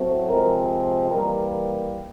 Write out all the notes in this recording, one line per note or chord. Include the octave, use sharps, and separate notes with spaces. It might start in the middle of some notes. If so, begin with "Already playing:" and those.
Already playing: A2 F#3 A3 C4
C3 F3 G#3 C4 A#4
E3 G3 A#3 A#4